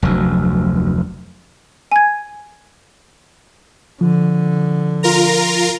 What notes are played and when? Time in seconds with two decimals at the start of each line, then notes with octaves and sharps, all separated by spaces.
0.02 F1 D2 F#3
1.92 G#5 G#6
4.01 D3 F3
5.03 F4 A#4 A#5